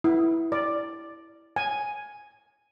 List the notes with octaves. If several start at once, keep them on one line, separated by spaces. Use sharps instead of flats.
E4
D5
G#5